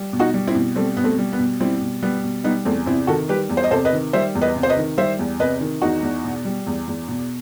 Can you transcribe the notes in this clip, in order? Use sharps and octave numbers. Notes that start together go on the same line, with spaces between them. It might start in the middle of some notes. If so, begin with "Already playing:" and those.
Already playing: G3
B2
D#4 F#4
G3
C4 E4
B2
G3 A3 C4
B2 B3
A3 C4
G3
B3
B2
G3 C4 E4
B2
G3 B3
B2
G3 B3 D#4
E2 A3 C4
C3 C4 E4
D#3 F#4 A4
G3 G4 B4
E2
C5
D#5
C3 A4 C5
B4 D#5
D#3
G3 C5 E5
E2
B4 D#5
C3
C5
B4 D#5
D#3
G3 C5 E5
E2
C3 B4 D#5
D#3
E2 D#4 F#4
E2
B2
G3
E2
E2
B2